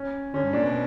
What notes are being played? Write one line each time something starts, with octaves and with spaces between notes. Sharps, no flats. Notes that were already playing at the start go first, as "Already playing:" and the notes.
Already playing: C#4
D3 C#4
G2
A#2 D4
B2